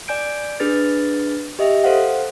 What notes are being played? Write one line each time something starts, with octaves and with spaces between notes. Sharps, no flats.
D5 G#5 G6 D7
D4 G#4 B4 A6
G4 D#5 E5
A4 C5 F5 F#5